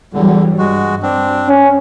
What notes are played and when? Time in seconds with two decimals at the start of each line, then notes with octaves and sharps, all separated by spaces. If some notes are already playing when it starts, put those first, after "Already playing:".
0.13 E2 D3 E3 F#3 G3
0.59 G2 G#3 F#4
1.03 C4 D4
1.48 C#4